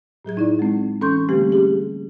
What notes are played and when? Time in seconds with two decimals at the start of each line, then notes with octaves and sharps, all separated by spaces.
0.25 A2 F#3 G#4 G#6
0.37 D#4 E4 D5
0.59 G#3 C4
1.01 E3 C#4 A4 C6 C#6 G6
1.29 D3 G3 A3 A#3 C4 G4
1.51 C#4 G4 G#4